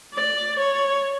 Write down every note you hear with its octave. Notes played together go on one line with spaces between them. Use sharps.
D5
C#5